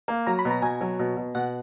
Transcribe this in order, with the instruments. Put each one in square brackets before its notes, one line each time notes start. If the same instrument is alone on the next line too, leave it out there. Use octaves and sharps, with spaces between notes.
[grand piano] A#3
[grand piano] F#3 [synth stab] A#5
[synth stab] B5
[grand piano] B2
[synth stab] A#5
[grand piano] B2 [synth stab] G#5
[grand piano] F#3
B2
B2
[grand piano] B2 [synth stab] F#5